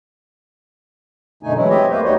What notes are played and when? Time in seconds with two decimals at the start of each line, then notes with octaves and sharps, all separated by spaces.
1.43 F#2 B2 D3 A3 D#4 G#5
1.56 E3 F#3 G#3 E4
1.70 C4 G4 C#5 D#5 E5
1.91 E2 A3 A#3 B4 C5
2.05 G3 D#4 F#4 C#5 D#5